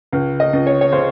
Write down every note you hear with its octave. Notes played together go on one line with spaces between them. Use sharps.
C#2
D#5
C#2
C#5
C#5
C#3 C5